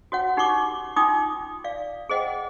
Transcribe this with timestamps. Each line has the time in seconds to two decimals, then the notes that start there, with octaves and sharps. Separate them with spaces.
0.12 F#4 C#5 F#5
0.37 D#4 G4 C#5 C#6 D6
0.96 D#4 F4 G5 C6 D6 D#6
1.64 D5 F5
2.09 G#4 C5 D#5 F#5 G5